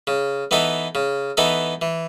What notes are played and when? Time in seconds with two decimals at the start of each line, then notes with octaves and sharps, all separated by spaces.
0.07 C#3
0.51 E3 B3 D#4 A4
0.95 C#3
1.37 E3 B3 D#4 A4
1.82 E3